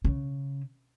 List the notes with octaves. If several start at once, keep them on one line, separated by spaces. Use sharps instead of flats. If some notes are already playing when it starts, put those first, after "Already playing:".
C#3